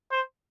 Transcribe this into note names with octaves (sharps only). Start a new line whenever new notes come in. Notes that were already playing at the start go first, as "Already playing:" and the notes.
C5